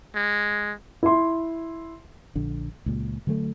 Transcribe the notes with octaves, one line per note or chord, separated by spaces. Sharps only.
G#3
E4 C6
A#1 D3
C#2 A#2
D3 F#3 G3 A3